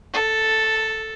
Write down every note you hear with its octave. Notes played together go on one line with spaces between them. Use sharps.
A4